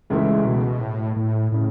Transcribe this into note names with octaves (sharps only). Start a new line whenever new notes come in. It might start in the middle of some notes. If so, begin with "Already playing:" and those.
C#2 C#3 E3 G#3 A3 E4
B2
A2
A2
A2 C#3